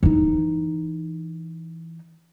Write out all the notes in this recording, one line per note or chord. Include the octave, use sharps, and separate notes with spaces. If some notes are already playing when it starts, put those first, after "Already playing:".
E3 D#4